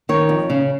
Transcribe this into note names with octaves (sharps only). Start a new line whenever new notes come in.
D#3 C#5
F2
C#3